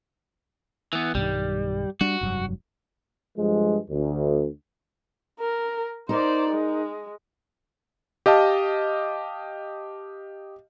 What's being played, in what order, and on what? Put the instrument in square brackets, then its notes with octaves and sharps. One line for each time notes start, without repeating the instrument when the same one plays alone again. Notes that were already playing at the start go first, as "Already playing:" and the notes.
[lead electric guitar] E3 B3
[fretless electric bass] B1 G2 D#3 [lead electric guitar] G3
[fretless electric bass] G3 D4 [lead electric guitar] F#4
[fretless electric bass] F1 G2 F#3
[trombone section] G2 F3 G#3
D2
[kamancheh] A#4
[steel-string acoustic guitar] D#4 A#4 [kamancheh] C5 D5
[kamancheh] G#3
[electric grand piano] G4 D#5 F5 A5